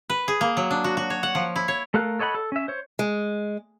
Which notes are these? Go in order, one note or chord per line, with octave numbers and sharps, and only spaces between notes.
B4
G#4
A#3
F#3
D4
F#4
F#4
C#5
F#5
F3
E4
C#5
A3 A4 A#4 F5 F#6
A4 C#5 D#5 F#5 B5
A4
C#4 E5
C5 C#5
G#3